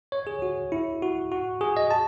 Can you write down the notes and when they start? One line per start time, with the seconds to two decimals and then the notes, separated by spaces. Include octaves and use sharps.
0.12 C#5
0.27 G#4
0.42 F#4
0.72 E4
1.02 F#4
1.32 F#4
1.61 G#4
1.77 D#5
1.91 A5